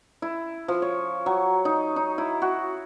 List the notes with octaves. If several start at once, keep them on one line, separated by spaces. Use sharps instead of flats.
E4
F3
C#5
F#3
D#4
D#4
E4
F#4